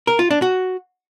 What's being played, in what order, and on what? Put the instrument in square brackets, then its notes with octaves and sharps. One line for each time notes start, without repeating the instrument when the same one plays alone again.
[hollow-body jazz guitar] A#4
F4
D4
F#4